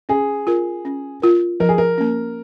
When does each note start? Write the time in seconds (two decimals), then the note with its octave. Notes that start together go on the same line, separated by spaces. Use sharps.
0.09 C#4 G#4
0.47 F4 A#4
0.85 C#4
1.22 F4 A#4
1.60 F3 A#4
1.69 G#4
1.78 A#4
1.98 A#3 C#4